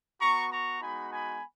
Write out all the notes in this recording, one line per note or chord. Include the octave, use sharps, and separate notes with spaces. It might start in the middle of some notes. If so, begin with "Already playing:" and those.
B3 F#4 A#5 C#6
A#5 C#6
G#3 B3 D#4 F#4 G#5 B5
G#5 B5